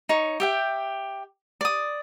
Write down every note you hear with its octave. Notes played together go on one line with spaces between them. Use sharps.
D#4 C#5
G4 E5 G5
D5 D#6